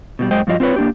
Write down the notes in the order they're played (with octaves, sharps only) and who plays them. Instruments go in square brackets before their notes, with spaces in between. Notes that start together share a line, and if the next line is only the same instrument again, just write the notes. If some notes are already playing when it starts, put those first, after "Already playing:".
[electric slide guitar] B2 D#3 G3
F#2 G#3 C5 D#5 G5
G2 F3 F#3 F4 D#5
C4 F4 A4 B4 C#5
A#3 D4 G4